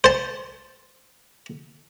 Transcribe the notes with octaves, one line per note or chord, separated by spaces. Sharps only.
C5 A5